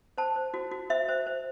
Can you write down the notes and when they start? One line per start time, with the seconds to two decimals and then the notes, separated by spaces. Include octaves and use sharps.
0.18 C5 A5
0.36 C5
0.54 F#4
0.71 F#4
0.90 C5 E5
1.09 C5
1.27 C5